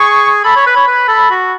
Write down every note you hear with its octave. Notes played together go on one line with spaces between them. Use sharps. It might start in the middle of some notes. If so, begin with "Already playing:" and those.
Already playing: G#4 C#6
A4 B5
C#5
B4
C#5
B4
A4
F#4